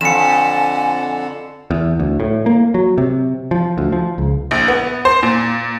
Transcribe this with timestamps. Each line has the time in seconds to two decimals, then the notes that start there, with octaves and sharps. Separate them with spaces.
0.01 F2 D3 G#5 C#7 E7
1.71 E2
2.00 D2
2.20 A2
2.46 A#3
2.74 F#3
2.98 C3
3.51 F3
3.78 D2
3.92 F3
4.18 C#2
4.51 A#1
4.68 B3
5.05 C5
5.23 A#2